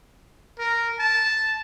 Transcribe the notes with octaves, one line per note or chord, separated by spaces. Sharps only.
A#4
A5